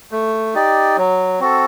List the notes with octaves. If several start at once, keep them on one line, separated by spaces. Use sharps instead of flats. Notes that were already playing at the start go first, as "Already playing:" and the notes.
A3
D#4 G4 D5
F#3
C4 F#4 A4